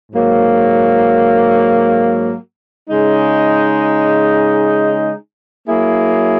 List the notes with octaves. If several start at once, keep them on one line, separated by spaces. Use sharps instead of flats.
G#2 F#3 A#3
C#3 G#3 D#4
F#3 A#3 E4 G#4